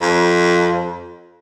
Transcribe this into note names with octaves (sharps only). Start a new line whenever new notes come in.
F2